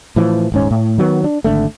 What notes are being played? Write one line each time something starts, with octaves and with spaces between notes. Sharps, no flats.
A2 E3 F3
D#1 G#2 C#4
A2
D#3 F#3 B3
D4
G#1 D3 A3